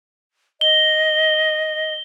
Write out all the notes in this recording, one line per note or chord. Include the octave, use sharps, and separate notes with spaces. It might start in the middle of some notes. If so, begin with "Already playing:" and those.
D#5 G7